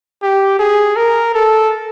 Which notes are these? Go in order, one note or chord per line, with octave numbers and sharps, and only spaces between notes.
G4
G#4
A#4
A4